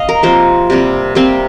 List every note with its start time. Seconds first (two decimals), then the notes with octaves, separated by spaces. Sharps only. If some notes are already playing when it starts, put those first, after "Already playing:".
Already playing: D#5 F5
0.09 A#4
0.23 C3 F3 A#3 C5
0.70 C3 G3 A#3
1.15 C3 G3 A#3 C4